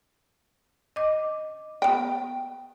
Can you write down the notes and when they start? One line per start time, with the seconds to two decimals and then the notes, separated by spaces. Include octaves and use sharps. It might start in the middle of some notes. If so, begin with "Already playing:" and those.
0.96 D#5 D6
1.82 B3 G5